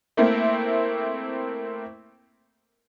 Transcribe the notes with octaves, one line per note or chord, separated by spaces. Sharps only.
A3 A#3 C4 E4